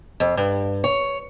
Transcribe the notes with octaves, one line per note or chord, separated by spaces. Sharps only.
F2
G2
C#5